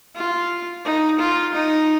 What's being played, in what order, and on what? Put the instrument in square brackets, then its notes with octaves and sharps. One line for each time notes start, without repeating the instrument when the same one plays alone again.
[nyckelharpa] F4
D#4
F4
D#4